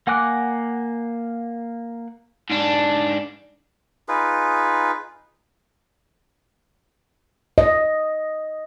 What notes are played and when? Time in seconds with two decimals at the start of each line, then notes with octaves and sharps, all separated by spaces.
0.07 A#3 F#5 G#5 D6 F#6
2.50 G#2 D4
4.08 D#4 F4 G#4 B4
7.58 D#5